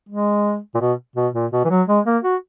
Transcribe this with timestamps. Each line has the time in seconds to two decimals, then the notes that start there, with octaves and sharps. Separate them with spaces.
0.09 G#3
0.75 A#2
0.80 B2
1.16 B2
1.34 A#2
1.52 B2
1.65 E3
1.70 F#3
1.88 G#3
2.06 A#3
2.23 F#4